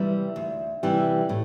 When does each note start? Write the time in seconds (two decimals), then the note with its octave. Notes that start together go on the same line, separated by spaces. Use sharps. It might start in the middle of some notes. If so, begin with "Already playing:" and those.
Already playing: C3 E3 G3 E5
0.36 D2
0.83 C3 E3 G3
1.29 A2